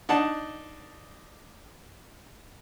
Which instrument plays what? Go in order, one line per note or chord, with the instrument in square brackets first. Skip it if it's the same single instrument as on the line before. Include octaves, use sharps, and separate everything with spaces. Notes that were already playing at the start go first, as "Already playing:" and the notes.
[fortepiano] D4 D#4 F#5 A5